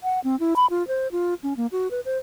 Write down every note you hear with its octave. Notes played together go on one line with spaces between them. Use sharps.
F#5
C4
E4
B5
F4
C5
F4
C#4
A#3
F#4
B4
C5